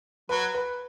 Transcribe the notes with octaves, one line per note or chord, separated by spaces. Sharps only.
F#3 B4
B4